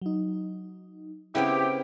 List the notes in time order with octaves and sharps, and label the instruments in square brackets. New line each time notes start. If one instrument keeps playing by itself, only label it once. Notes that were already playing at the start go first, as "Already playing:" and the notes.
[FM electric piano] F#3 D#4
[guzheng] C#3 B3 C4 [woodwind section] E4 G4 [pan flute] G5